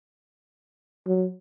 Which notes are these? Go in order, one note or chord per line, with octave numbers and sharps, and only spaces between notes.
F#3